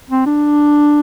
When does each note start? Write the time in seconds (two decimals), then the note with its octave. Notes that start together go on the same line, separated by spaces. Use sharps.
0.09 C4
0.26 D4